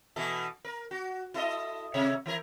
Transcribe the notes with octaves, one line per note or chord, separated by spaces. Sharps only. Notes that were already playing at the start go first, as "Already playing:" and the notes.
B2 E3 A4
A#4
F#4
E4 A4 D#5
C3 C#5 E5
E3 E4 A#4